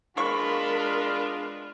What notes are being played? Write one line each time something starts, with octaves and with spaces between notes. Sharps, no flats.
G#3 A#3 B3 D4 F4 A#4 B5 C#6